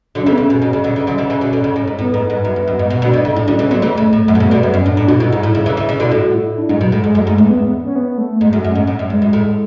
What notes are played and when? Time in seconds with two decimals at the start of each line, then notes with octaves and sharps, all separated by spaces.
0.15 D3 F#3 D4
0.23 C#4
0.26 C#3 E3
0.32 B3
0.38 C#3 C#4
0.50 B2
0.62 B2
0.73 C#3
0.84 B2 D3
0.96 C#3 E3
1.07 D3 F#3
1.18 C#3 E3
1.30 C#3 E3
1.41 B2 D3
1.53 B2 D3
1.64 C#3
1.76 A2
1.87 G#2
1.99 A2 B3
2.14 G#2
2.30 G#2
2.45 F#2
2.56 E2
2.68 F#2
2.79 G#2
2.90 B2 B3
3.02 B2 D3
3.06 D4
3.13 B2 D3
3.22 C#3 E4
3.36 A2 D4
3.48 D3 F#3 C#4
3.59 C#3 E3 C#4
3.70 D3 F#3 B3
3.82 C#3 E3 A3
3.97 C#3
4.13 A2
4.28 F#2 A3
4.35 B2
4.40 C#3
4.44 B3
4.51 B2 D3
4.59 F#2 B3
4.74 F#2 C#4
4.86 A2 D4
4.97 A2 D4
5.08 B2 F#4
5.20 B2 E4
5.33 G#2
5.43 A2
5.55 C#3
5.66 C#3 E3
5.77 C#3 E3
5.89 C#3 E3
6.00 B2 D3
6.03 E4
6.11 A2 F#4
6.35 E4
6.58 D4
6.69 G#2 G#3
6.80 B2 F#3
6.92 A2 G#3
7.03 G#2 G#3
7.15 F#2
7.19 A3
7.27 G#2
7.34 E2 G#3
7.50 B3
7.61 B3
7.84 C#4
7.96 B3
8.18 A3
8.41 G#2 G#3
8.53 F#2
8.56 A3
8.64 F#2
8.72 G#2 C#4
8.87 A2
8.99 F#2
9.10 E2 G#3
9.22 F#2
9.33 A2